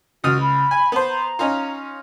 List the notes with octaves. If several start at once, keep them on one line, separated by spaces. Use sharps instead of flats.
C#2 F#4 D#6 F6
B5
G#5
B3 C5
A#5
C#4 D#4 F4